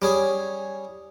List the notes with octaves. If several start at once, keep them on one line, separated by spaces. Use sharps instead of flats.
G3 C#4 G#4